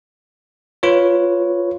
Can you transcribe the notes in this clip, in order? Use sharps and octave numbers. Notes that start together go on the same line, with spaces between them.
F4 B4 C#5